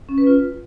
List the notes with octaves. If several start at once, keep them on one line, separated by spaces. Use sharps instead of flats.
C#4
B4
F4